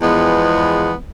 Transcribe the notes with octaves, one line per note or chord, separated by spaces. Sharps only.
E2 F3 G#3 B3